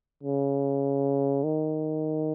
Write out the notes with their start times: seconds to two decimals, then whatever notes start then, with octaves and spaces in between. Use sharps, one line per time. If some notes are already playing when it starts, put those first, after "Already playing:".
0.23 C#3
1.44 D#3